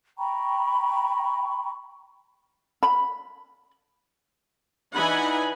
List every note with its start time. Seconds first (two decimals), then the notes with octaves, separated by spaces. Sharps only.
0.18 G5 A#5 B5 C#6
2.83 B5
4.94 E3 D4 D#4 F#5 G#5 B5